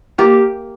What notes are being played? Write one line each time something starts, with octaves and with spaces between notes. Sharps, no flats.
A#3 G4